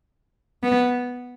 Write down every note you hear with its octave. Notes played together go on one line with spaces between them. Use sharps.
B3